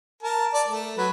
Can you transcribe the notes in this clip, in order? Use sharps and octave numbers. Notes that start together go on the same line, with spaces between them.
A#4 A5
D5 A5
A3
F#3 B4